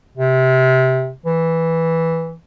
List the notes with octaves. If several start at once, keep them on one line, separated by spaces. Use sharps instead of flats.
C3
E3